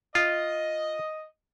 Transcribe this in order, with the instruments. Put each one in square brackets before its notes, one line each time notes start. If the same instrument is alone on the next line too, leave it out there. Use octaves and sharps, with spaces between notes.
[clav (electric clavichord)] F4 [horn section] D#5